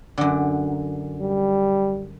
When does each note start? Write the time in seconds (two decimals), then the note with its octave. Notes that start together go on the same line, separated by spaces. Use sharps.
0.18 F#2 D3
1.21 G3